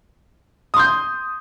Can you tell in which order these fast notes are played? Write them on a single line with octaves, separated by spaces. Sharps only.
D#6 C6 G6